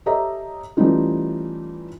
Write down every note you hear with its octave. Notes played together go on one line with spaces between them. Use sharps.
G4 A4 C#5 D#5 E5 A#5
E3 G3 A3 C#4 D#4 F4